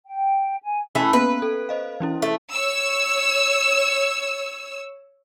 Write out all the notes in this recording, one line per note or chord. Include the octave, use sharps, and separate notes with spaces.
G5
G#5
E3 A3 C#4
A#3 B3 C#4 B4
A4
C5 D#5 F5
E3 C#4 E4
A3
C#5 E6